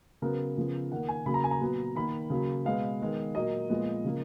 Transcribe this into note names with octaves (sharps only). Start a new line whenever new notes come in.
C#3 F#3 B3 A#4
C#3 F3 B3
D#3 A#3 F#5
G#5
C#3 F#3 A#3 B5
A#5
G#5
A#5
A#2 F#3 B3
D#3 A#3 B5
C#3 F#3 A#3
B2 G#3 B3 F5
D#3 G#3 B3
A#2 F#3 A#3 D#5
A#2 F3 G#3 B3
C#3 F3 A#3